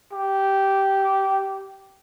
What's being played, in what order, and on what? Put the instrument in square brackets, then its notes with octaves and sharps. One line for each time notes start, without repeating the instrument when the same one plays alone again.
[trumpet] G4